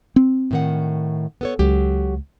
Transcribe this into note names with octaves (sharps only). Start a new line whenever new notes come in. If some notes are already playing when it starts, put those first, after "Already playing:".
C4
A2 D#3 F#5
B3 A4 C#5
C#2 F#3 G4